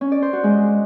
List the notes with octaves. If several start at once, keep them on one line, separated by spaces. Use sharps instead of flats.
C#4
D5
C5
F#4
G#3